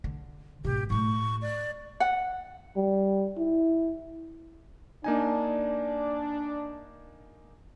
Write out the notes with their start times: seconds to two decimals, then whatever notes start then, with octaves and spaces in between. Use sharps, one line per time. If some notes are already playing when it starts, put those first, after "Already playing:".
0.04 D3
0.64 G#1 B2 G4
0.90 A2 A3 C#6
1.42 D5
2.00 F#5
2.77 G3
3.37 E4
5.04 A#3 D4 D#4 G#5